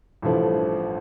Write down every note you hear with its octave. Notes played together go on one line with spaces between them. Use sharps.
A1 G2 F3 A3